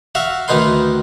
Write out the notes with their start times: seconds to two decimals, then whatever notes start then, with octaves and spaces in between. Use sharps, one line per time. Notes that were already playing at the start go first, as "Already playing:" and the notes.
0.15 F#4 E5 F5
0.48 D2 D#3 D#4 B4 C6